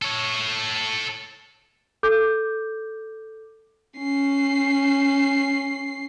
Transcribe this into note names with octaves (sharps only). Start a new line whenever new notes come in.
A4 C#5
A4 D6 G6
C#4 C7